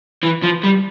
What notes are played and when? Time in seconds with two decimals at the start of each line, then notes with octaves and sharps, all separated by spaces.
0.23 E3
0.44 F3
0.64 G3